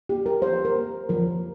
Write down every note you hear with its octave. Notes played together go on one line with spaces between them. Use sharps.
A#3 G4
A#4
F3 C5
A#4
A#3
F3 A#4